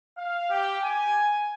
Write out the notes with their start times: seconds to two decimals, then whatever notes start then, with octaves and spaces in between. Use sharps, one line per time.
0.17 F5
0.50 G4
0.82 G#5